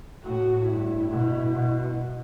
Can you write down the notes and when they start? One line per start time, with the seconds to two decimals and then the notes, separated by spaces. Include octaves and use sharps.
0.24 A2 F#4
0.67 G2 E4
1.10 B2
1.54 B2